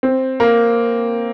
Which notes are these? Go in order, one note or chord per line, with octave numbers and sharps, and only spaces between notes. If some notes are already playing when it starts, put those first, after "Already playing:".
C4
A#3